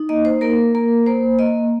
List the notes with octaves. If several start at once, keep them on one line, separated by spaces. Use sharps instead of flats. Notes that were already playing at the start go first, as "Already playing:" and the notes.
Already playing: D#4
A#3 D#5
C5
A#3 A#4
A#3 A#4
A#3 C5
A#3 D#5